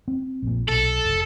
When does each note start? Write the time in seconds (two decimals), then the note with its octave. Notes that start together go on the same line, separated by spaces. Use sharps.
0.08 C4
0.42 A#1 A#2
0.69 B1 A4
1.05 F1